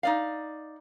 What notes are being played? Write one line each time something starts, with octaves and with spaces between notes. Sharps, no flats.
D#4 D5 F5